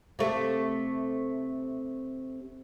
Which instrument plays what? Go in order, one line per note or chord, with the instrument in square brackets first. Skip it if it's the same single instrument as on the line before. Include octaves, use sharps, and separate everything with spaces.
[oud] C3 A3